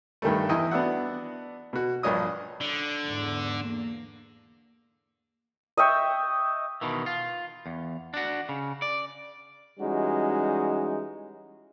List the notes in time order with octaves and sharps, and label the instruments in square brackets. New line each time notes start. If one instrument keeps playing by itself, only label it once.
[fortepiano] G2 D#3 G3 A3
E2 E4 D#5 G5 G#5
B3 D4 F#4 E5 F#5
B2 F#4
A#1 G2 D4 C#5 D#5 D#6
[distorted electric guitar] D3
[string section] E2 G#2
A#3
[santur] D#5 E5 G5 C#6
[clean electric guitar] B2 D#3 E3
F4
E2
D4 F#4
C#3
D5
[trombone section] E3 G3 G#3 C#4 D#4 F#4